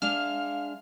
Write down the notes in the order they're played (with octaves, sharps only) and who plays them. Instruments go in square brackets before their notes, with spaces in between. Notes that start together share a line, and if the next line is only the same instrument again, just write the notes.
[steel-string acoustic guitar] G#3 D4 E5 [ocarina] F5 [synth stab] F6